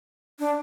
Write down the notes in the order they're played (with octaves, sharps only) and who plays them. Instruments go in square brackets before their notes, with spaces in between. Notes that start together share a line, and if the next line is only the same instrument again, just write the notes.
[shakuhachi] D4